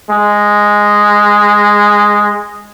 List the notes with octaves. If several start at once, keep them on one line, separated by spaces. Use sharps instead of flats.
G#3